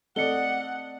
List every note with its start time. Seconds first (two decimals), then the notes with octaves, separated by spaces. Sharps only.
0.16 A3 C4 A4 D5 D#5 F#5 C#7 G7